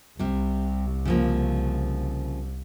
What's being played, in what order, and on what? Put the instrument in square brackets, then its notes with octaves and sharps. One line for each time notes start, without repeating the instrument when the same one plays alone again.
[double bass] C2 [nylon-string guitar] C3 G3
[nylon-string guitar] C#3 F3 A#3